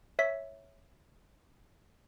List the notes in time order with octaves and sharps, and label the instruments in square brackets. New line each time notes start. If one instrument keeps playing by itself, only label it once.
[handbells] C#5 E5 B6